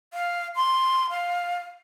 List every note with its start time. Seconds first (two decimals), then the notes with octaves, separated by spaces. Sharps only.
0.14 F5
0.56 C6
1.10 F5